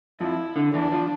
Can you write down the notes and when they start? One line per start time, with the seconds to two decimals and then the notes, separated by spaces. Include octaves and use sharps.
0.20 F2 F3 E4
0.56 D3
0.74 E2 E3 D4
0.92 F3